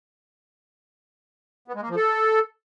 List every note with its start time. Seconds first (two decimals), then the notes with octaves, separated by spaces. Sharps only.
1.68 B3
1.75 G#3
1.82 A#3
1.89 F3
1.96 A4